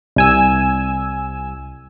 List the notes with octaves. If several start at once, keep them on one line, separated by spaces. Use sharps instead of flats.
C2 G#5 E6